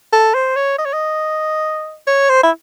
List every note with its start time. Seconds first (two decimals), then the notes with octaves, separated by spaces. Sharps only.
0.13 A4
0.35 C5
0.56 C#5
0.78 D#5
0.85 C#5
0.93 D#5
2.07 C#5
2.29 C5
2.43 E4